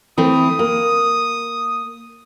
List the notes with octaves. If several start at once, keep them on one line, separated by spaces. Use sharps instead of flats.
E3 A3 C4 D#6
A#3